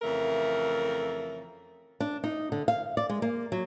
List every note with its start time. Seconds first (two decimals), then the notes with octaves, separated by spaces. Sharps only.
0.02 F2 C#3 E3 A3 A#4
2.00 D4
2.24 D#4
2.52 D3
2.68 F5
2.97 D5
3.09 G#3
3.22 A#3
3.52 F#3